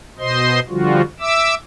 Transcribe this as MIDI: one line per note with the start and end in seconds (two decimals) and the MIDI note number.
0.19 0.60 47
0.19 0.60 72
0.19 0.60 75
0.19 0.60 84
0.69 1.02 50
0.69 1.02 53
0.69 1.02 55
0.69 1.02 65
0.69 1.02 66
1.20 1.55 76
1.20 1.55 86
1.20 1.55 88